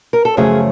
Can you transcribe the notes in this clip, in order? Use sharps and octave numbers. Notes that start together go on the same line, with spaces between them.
A#4
A4
F#2 C#3 F3 A3 G#4